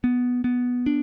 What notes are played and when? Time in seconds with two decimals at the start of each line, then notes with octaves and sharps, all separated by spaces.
0.04 B3
0.44 B3
0.86 D4